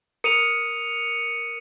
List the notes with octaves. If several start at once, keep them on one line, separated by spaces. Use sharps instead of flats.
A#4 D#6 C#7 D#7 F7